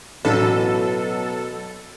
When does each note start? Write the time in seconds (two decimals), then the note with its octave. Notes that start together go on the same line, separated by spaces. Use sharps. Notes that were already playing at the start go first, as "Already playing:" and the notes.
0.25 A1 B2 F#3 A4